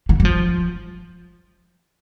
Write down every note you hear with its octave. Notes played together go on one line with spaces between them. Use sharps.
E3
G3
F3